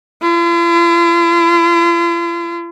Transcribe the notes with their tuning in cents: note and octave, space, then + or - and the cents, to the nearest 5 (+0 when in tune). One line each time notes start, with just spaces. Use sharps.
F4 -45